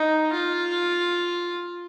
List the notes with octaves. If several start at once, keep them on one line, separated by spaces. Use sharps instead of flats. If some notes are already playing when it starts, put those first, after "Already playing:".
Already playing: D#4
F4